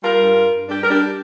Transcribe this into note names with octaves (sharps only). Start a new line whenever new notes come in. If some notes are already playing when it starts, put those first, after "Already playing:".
G3 F4 A#4
G2
G2
G2
G3 D4 G4
G3 A#4
D4 G4